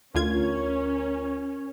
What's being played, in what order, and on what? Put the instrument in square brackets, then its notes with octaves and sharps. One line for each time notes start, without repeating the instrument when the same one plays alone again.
[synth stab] D2 F4 G#6 [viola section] C#4 [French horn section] A#4